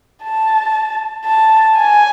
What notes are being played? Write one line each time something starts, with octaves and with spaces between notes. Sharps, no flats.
A5
A5
G#5